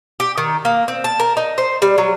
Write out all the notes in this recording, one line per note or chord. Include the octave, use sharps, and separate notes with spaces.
G4
D#3
A#3
C4
A5
A#4
D#4
C5
G3
F#3